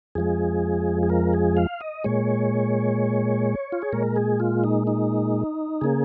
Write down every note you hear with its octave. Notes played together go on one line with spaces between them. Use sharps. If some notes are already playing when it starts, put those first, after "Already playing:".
F2 F3 G#3 G#4
G#4
A#4
G#4
F5
D#5
A#2 G#3 C#5
F4
G#4
A#2 G#3 A#4
G#4
F4
D#4
D#4
C#3 A#3 G#4